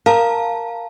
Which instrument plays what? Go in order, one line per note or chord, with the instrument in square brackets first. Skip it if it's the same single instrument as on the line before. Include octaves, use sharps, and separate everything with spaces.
[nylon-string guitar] A#4 [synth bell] F5 A5